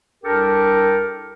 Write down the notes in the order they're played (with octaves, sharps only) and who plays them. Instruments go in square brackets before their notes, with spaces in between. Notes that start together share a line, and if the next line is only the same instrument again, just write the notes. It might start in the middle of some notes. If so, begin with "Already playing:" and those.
[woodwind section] C2 D4 G4 A4 A#4